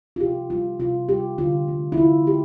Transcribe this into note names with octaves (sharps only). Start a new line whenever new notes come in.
F4
C3 G4
G3 F4
C3 F4
G3 G4
D3 F4
A3
E4
D3 F4
A3 G4